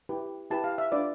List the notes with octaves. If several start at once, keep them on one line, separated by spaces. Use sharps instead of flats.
E4 G4 B4
E4 G4 B4 A5
F5
E5
D4 F4 B4 D5